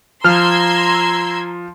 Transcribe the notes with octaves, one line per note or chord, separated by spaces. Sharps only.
F3 A#5 C6 E6 F6 G#6